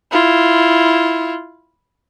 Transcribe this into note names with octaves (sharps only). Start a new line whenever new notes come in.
E4 F4